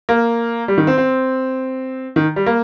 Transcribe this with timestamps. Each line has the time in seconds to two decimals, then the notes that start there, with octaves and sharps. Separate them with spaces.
0.09 A#3
0.68 G3
0.78 D#3
0.87 C4
0.98 C4
2.16 D#3
2.36 G3
2.46 A#3